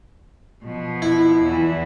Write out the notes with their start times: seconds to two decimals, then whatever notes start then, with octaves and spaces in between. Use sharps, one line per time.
0.64 B2 F3
1.02 E4
1.44 E2 E3